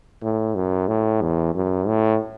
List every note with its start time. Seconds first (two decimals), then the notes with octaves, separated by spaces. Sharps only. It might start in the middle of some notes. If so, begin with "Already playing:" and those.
0.23 A2
0.55 F#2
0.88 A2
1.21 E2
1.55 F#2
1.87 A2